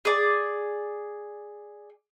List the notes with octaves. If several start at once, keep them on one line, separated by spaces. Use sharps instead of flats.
G#4 D5